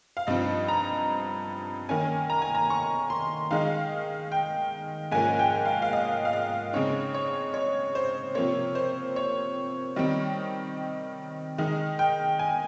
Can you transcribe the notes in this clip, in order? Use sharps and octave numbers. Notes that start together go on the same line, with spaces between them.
F5
G2 F3 C4 D#4 D#5
A#5
D#3 A#3 C#4 G#5
A#5
G#5
A#5
C#6
C6
D#3 G#3 D#4 F5
G5
G#2 F3 A#3 C#4 G#5
G5
F5
F5
D#5
F5
D#5
C#3 G#3 C4 D#4 C#5
C#5
C#5
C5
C3 F3 A#3 C#5
C5
C#5
D#3 G3 C4 D#4
D#3 G#3 D#4 D#5
G5
G#5